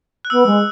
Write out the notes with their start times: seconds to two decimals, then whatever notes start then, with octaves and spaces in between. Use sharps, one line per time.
0.25 F#6
0.30 B3 E6
0.45 G#3